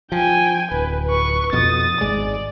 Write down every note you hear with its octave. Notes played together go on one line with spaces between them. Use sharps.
F3 G5 G#5
D1 B4
B4 C#6
F2 B2 D#6 A6
G#1 G#2 G#3 D5